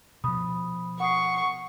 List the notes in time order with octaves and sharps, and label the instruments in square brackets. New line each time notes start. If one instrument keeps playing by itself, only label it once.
[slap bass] B2 F3 [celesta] B5 D#6
[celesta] F#5 D#6 C7 [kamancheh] C#6